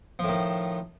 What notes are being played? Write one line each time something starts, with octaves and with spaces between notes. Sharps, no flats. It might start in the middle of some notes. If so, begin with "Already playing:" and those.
A2 D#3 F3